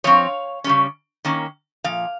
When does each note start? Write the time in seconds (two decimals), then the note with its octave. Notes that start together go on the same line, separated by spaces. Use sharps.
0.04 F3 C4 C#5 F5
0.64 C#3 G3 C#4
1.25 D#3 A#3 C#4
1.84 A#2 F3 F5